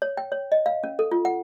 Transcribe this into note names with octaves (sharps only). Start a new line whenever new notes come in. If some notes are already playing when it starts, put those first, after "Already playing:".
C#5
G5
C#5
D#5
F5
C#4
A4
F4
F#5